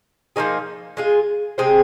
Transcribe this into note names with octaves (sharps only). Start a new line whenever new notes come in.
F3 A#3 D#4 G#4
G#3 F4 G#4
C3 G#3 C4 G#4